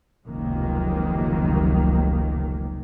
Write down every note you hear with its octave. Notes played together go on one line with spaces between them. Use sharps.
F1 C#2 C3 D#3 F#3 A#3